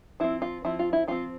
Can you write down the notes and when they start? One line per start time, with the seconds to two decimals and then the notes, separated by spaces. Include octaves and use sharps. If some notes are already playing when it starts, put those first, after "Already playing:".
0.20 F3 C4 E4
0.42 F4
0.65 F3 C4 E4
0.79 F4
0.93 E4
1.08 F3 C4 F4